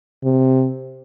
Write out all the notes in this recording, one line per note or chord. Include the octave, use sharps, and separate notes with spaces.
C3